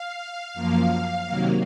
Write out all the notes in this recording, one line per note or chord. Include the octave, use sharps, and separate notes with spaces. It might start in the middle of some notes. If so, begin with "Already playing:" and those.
Already playing: F5
F#2 F3 A#3
C3 D#3 F#3 A#3